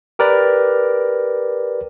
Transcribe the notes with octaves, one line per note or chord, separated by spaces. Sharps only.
G4 A#4 B4 D5